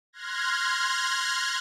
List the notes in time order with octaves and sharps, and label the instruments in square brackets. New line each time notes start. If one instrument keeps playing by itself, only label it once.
[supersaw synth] C6 F6 F#6 G#6 A#6